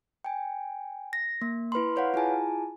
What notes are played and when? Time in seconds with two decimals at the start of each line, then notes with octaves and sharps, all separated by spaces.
0.25 G5 G#5
1.13 A#6
1.42 A#3
1.72 E4 B4 B5 C6
1.96 B4 C#5 F5 F#5
2.14 E4 F4 G#4 G#5 A5